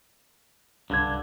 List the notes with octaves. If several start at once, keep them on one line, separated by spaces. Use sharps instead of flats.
C2 G2 D3 G#6